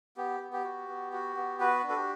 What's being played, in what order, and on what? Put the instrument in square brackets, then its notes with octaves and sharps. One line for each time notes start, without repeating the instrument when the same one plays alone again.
[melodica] B3 G4
B3
G4
F#4
B3
F#4
B3
F#4 B4
D4
A4
G4